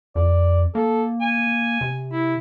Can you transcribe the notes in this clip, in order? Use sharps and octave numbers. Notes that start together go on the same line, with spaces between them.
F2 D5
A#3 A4
G#5
C3
E4